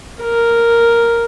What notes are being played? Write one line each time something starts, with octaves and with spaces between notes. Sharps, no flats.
A#4